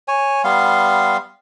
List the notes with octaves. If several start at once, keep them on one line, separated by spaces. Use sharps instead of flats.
C#5 G#5
G3 B3 F5 C6